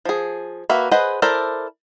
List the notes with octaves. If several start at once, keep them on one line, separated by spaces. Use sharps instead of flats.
F3 G#4
A#3 F#4 B4 E5
G#4 B4 C5 D#5 F#5
E4 A4 A#4 C5 D5